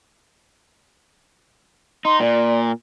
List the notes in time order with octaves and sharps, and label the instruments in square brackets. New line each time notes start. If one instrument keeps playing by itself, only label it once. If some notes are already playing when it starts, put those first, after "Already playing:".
[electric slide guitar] D#4 [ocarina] C6
[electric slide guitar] A#2 [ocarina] D5